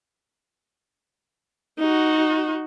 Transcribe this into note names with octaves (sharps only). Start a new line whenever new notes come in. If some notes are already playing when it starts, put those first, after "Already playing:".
D#4 F#4